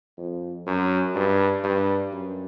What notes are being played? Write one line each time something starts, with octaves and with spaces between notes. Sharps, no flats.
F2
F#2
G2
G2
F#2